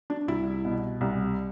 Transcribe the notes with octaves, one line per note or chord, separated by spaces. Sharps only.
D4
C2 E4
B2
C2